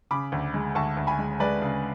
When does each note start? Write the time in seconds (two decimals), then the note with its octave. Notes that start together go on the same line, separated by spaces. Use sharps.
0.11 C#3 B5 D6
0.32 D2
0.54 G#3
0.75 D2 A5 C#6
0.97 D2
1.07 G#5 B5
1.19 G#3
1.40 G#3 B4 D5
1.62 C#3